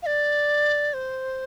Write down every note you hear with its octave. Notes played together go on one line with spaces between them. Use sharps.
F5
D5
C5